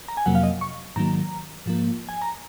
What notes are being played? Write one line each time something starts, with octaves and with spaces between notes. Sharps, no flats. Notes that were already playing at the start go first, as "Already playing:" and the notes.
A#5
G#5
F2 C3 F#3 A#3 F#5
F5
D#5
C#6
G#2 D#3 F#3 A#3 A#5
G#2 F3 A#3
G#5
A#5